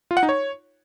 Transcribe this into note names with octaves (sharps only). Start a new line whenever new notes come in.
F4
F#5
D#4
C#5